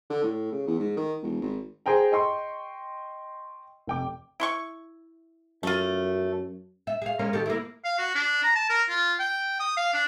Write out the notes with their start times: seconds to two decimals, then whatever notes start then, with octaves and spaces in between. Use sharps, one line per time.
0.10 D3
0.23 A2
0.52 C#3
0.67 E2
0.79 G#2
0.97 D#3
1.22 E1
1.42 G#1
1.86 G#4 C5 G5 A#5
2.12 D#5 G5 C6 C#6
3.87 F1 G5 D6
4.40 E4 C6 C#6
5.63 F#2 A3 F4
6.87 E5
7.02 G#4 F5
7.19 G#3 A#3 C#4
7.33 D#3 G4 A4
7.46 A#3 E4
7.84 F5
7.98 F#4
8.15 D4
8.43 A#5
8.55 A5
8.69 A#4
8.89 F4
9.19 G5
9.59 D#6
9.77 F5
9.93 D4